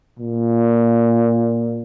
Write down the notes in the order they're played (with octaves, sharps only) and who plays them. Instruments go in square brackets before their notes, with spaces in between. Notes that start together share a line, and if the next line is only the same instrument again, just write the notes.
[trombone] A#2